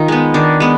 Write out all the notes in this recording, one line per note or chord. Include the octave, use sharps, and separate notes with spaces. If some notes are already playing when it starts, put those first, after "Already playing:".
Already playing: D#3 D#4 F4
G#3 B3
D#3 D4
G#3 B3